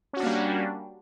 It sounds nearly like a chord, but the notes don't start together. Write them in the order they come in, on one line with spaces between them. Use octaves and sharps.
C#4 F#4 D4 A#3 G3